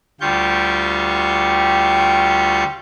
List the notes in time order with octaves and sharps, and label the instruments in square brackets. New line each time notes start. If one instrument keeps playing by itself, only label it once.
[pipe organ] D2 G3 F4 G4 C#6 G6